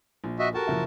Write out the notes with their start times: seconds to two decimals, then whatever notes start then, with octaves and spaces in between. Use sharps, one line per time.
0.24 A#1
0.39 F#4 D#5 E5
0.55 F#4 G4 A4 A#4 F#5 A5
0.67 F#1 F3 E5